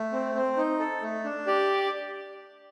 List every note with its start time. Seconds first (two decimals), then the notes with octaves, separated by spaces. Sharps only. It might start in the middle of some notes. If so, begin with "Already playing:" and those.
Already playing: A3
0.13 C4
0.35 C4
0.57 D#4
0.79 A4
1.02 A3
1.24 D4
1.47 G4 D5